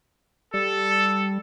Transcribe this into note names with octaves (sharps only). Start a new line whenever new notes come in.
G3 A4